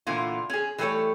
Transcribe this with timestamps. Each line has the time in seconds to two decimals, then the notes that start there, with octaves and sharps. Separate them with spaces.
0.07 A#2 D3 E3 B3 F4
0.50 C#4 G#4
0.78 E3 G3 A3 G#4 A4 C#5